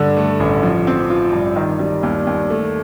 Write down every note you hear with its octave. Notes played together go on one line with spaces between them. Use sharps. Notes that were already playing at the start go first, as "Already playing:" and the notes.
Already playing: G2 D3
A3
A1
F3
C4
F4
G2
D#3
G3
D#2
D#2
A3